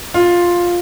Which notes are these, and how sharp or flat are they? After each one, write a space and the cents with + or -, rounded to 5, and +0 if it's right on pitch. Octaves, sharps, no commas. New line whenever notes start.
F4 +5